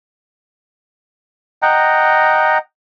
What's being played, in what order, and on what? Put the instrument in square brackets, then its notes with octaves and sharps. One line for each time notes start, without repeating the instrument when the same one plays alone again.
[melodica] D#5 F#5 G5 A#5